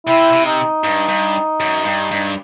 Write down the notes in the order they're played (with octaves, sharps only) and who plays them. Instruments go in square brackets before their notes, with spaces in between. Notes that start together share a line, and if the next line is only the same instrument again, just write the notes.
[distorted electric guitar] C3 [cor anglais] E4
[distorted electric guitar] C3
[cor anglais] D#4
[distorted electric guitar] G2
G2
F#2
G2
G2